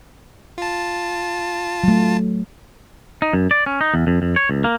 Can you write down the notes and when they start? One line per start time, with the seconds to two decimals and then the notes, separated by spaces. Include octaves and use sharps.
0.58 F4 A5
1.84 F#3 A3
3.22 D#4
3.33 F#2
3.51 D5
3.66 C#4
3.81 D#4
3.94 E2
4.07 F2
4.22 F2
4.36 C#5
4.49 C#2
4.64 A#3